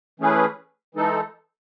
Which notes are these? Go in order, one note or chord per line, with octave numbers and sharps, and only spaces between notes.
E3 A3 C#4 G#4 B4
E3 G#3 D#4 A4